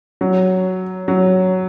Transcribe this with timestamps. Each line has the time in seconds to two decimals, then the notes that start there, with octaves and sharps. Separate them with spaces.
0.21 F#3
1.08 F#3